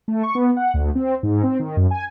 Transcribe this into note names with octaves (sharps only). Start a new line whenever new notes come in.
A3
C#6
B3
F#5
D2
C4
G#2
C4
D#3
F#2
G#5